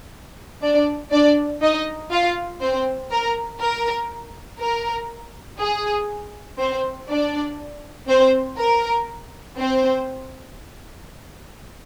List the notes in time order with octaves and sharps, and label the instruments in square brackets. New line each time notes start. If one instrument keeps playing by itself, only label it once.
[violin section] D4 D5
D4 D5
D#4 D#5
F4 F5
C4 C5
A#4
A#4
A#4
G#4
C4 C5
D4 D5
C4 C5
A#4
C4 C5